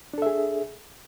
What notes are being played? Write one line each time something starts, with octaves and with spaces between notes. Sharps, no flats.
D4 G#4 A4 E5